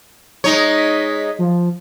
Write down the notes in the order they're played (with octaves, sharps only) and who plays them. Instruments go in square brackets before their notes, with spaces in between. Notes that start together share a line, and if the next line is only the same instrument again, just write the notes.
[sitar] G#3 D#4 C#5
[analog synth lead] B6
F3